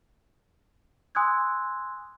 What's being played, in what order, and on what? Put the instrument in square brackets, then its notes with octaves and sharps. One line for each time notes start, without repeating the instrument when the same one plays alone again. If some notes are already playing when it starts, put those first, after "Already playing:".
[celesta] G#5 C6 D#6 E6 F#6 G#6